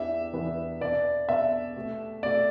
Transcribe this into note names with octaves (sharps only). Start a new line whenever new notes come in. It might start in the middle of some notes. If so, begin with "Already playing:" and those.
Already playing: E2 E3 B3 D4 G4 E5
E2 E3 B3 D4 G4
B2 B3 D4 D5
B2 B3 D4 E5
B2 A3 G4
B2 A3 G4 D5